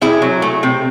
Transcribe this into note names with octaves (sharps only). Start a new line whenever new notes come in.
C3 E4 G#4
F#3
A3
C3